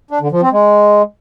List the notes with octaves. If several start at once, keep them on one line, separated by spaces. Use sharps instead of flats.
D4
D3
F3
C4
G#3